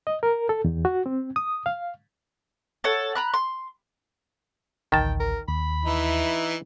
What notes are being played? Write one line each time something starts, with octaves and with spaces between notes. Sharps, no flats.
D#5
A#4
A4
E2
F#4
C4
D#6
F5
A4 C#5 F#5
A#5 B5 F#6
C6
A1 D2 D#3 G5 A5
A#4
D#2 B5
E3 D#4 E4